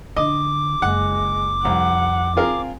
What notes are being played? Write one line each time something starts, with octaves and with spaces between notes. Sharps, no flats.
D3 D#5 D6
F#1 G#3 F#5
C2 F2 F#5
C4 F4 G#4 A#4